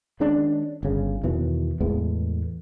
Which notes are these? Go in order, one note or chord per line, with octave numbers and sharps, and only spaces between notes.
D#3 G#3 C#4 D4
G1 C#3
E2 B2 D#3 E3
E2 A2 G#3 B3